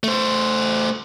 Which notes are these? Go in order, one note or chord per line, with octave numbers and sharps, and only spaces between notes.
A3 C5